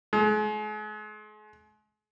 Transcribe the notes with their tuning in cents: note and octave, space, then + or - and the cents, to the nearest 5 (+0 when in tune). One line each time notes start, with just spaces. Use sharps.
G#3 +40